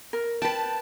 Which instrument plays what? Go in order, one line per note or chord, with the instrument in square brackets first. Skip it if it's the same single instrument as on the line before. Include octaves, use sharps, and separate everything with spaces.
[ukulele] A#4
[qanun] B4 G5 [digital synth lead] A5